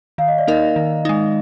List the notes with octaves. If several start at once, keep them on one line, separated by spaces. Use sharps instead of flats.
D#3 F5
D#5
D5
A#3 D#4 A#4 D#5
D#3
G#3 D#4